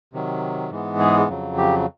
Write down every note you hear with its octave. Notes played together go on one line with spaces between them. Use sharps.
C3 D#3 F#3
G#2 E3 G#3 B3
G#4
F2 C#3 F#3
G4